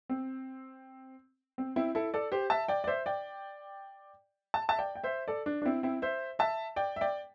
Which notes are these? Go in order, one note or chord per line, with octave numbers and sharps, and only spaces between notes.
C4
C4
C4 E4
E4 A4
A4 D5
G4 C5
E5 A5
D5 G5
D5
C5 E5
D5 G5
A5
E5 A5
D5 G5
G5
C5 E5
A4 D5
D4
D4
C4 E4
C4 E4
C5 E5
E5 A5
D5 G5
E5
D5 G5